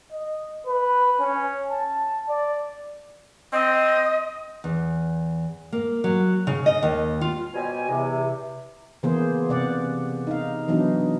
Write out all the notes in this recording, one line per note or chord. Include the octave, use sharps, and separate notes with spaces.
D#5
B4
C#4
A5
D5
C4 D#5
E2
A#3
F#3
C#3
D#5
D#2
F4
B2 G3 C#4 C5 D#5 G#5
E2 C3
C#3 E3 A#3 B3 G#4 C5
C3 D5 F#5
D#4 F5
E3 F#3 B3 D4 D#4